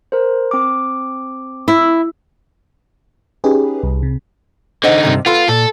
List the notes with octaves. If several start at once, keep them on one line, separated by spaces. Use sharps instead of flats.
A#4 C5
C4 D6
E4
C#4 D#4 G4 G#4 B4
C2
C3
D3 D#4 C5 D#5 F#5
G2 C3 D#3
B3 F4 A4 C6
A#2 A4